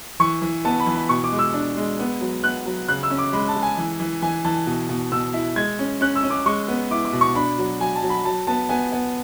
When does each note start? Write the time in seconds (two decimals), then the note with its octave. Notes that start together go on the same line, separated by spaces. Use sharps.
0.20 E3 C#6
0.42 E3
0.65 B3 A5
0.80 B5
0.86 E3
0.95 B5
1.09 B2 C#6
1.24 D6
1.32 G#3
1.39 E6
1.54 D4
1.77 G#3
1.99 B3
2.21 F#3
2.43 B3 F#6
2.66 F#3
2.88 C#3 F#6
3.03 E6
3.10 C#4
3.18 D6
3.33 G#3 B5
3.48 A5
3.56 G#3
3.62 G#5
3.78 E3
4.00 E3
4.22 E3 G#5
4.45 E3 A5
4.67 B2
4.89 B2
5.12 B2 E6
5.34 E4
5.56 G#3 G#6
5.79 C#4
6.01 C#4 F#6
6.16 E6
6.23 C#4
6.30 D6
6.46 G#3 C#6
6.68 B3
6.91 E4 D6
7.05 D6
7.13 B2
7.21 C#6
7.35 D4 B5
7.58 F#3
7.80 F#3 G#5
7.96 A5
8.03 F#3
8.09 B5
8.25 F#3 A5
8.47 B3 A5
8.69 B3 G#5
8.92 B3